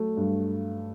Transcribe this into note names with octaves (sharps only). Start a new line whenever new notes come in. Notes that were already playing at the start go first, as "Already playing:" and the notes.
Already playing: F#3 A3
G2